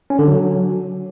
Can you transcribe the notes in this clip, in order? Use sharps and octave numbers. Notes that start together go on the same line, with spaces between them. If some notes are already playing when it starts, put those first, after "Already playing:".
C#4
D3
F#3